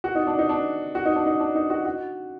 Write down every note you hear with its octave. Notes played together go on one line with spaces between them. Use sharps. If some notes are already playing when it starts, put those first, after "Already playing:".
F#4
D#4
D4
D#4
D4
F#4
D#4
D4
D#4
D4
D#4
F#4
F#4